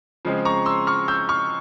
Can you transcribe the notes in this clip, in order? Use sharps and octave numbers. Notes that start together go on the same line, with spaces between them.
C#3 F3 G#3 C4
A#5 C#6
C6 E6
C#6 F6
E6 G6
C#6 F6